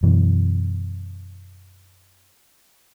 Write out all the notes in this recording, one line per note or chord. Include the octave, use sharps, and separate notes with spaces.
F#2 B2 E3